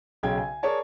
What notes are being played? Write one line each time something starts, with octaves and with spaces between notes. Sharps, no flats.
B1 C#3 G5 G#6
G#5
G#4 A#4 C#5 D5 A5